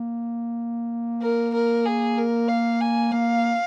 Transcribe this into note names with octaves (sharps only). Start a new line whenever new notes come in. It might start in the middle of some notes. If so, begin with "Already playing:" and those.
Already playing: A#3
A#4
A#4
G#4
A#4
F5
G#5
A#3 F5